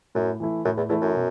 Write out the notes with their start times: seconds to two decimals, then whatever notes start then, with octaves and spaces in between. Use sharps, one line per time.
0.15 F#2 A2
0.40 E3 A3 E4
0.65 F#2 A2
0.77 E2
0.89 E2 E3 A3 E4
1.02 F#2
1.15 B2